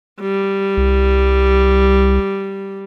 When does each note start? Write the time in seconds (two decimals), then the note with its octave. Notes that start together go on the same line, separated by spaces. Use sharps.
0.20 G3
0.77 C2